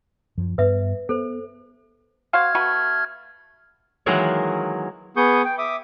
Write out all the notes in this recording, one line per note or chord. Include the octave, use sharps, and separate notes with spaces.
F#2 F3
G2 B3 B4 E5
B3 A4 C5
F#4 C5 F5 F6 G#6
A3 F#4 B4
D#3 E3 F#3 G#3 A#3
B3 G#4 C#6 D#6 G6
G5
E5 D6 D#6